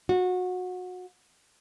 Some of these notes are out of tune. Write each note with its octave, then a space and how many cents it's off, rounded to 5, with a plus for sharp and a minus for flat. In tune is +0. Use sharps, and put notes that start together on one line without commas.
F#4 -25